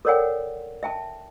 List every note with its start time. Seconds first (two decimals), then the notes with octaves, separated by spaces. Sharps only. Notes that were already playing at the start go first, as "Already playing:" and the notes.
0.05 A4 A#4 C#5 D5 F#5 G5
0.83 E5 G5 A5